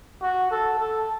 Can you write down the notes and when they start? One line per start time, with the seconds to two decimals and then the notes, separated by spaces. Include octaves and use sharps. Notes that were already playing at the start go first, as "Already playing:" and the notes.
0.22 F#4
0.51 A4
0.79 A4